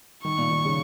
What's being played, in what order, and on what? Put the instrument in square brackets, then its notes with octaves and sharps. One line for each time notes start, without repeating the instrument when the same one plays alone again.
[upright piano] D#3 [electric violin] C#6
[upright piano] A#2
D#3
C#3